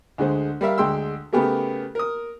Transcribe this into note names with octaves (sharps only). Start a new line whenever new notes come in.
D2 D3 G#3 C5
G3 A#4 E5 F5
D2 D3 G#3 G5 C6 E6
C#3 A3 B3 G4 G#4 A#4
A#4 D#6